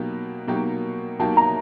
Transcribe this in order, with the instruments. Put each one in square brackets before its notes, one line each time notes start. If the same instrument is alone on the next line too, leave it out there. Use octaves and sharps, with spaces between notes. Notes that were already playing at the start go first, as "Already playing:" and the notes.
Already playing: [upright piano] B2 F#3 A#3 D#4 G4
B2 F#3 A#3 D#4 G4
[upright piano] B2 F#3 A#3 D#4 G4 [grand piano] A5
[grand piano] A#5